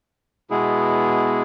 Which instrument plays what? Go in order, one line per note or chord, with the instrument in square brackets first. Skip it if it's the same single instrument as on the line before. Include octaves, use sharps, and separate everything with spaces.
[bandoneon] B2 G#3 B3 E4 G#4